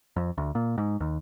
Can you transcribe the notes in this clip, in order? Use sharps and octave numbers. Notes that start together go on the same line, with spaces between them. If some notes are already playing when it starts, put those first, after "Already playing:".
F2
D2
A#2
G#2
D#2